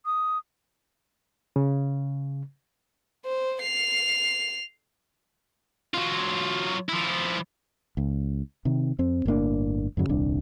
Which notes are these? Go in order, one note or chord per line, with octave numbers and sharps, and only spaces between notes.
D#6
C#3
C5
C7 F7
F#3 F4
F3 E4
C#2
C3 D#3
F2 C4
G1 A2 A#3 D4
F2 G#2 C#3 F#3
D#1 C2 D4